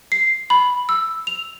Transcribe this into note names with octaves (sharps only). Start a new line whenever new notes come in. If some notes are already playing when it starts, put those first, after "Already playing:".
C7
B5
E6
F7